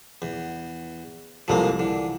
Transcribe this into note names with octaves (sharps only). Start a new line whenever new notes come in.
E2
C2 F3 G#3 A#3 A4
D3 E3